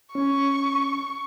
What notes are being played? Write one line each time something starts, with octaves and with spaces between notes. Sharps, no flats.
C#4 C#6